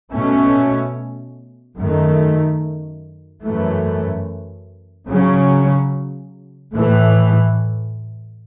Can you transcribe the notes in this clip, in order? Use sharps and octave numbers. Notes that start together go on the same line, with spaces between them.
B2 A3 C#4
F#2 D#3 A3
F#2 E3 A3
C#3 F#3 C#4
A2 E3 A3